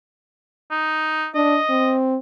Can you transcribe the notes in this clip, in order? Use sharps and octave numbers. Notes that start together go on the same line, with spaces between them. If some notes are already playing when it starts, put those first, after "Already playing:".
D#4
D4 D#5
C4